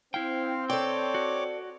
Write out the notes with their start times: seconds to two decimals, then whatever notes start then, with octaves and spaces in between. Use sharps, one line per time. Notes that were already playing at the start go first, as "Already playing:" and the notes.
0.14 C4 E4 F5 G5
0.70 A4 C#5 D5 G5 D6
1.14 F#4